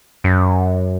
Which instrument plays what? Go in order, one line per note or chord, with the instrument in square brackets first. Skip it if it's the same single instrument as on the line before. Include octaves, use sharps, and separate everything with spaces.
[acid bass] F#2